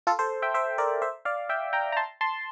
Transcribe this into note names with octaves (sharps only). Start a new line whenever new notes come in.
F4 A4
A4 C5
E5 G5
C5 E5
A#4 D5
C5 E5
D5 F5
E5 G5
G5 A#5
A#5
A5 C6
A5 C6